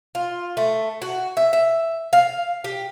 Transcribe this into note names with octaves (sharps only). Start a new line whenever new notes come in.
F4
A3
F#4
E5
E5
F5
G4